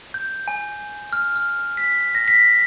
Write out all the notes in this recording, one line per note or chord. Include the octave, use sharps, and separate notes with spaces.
G6
G#5
F6
F6
B6
A#6
B6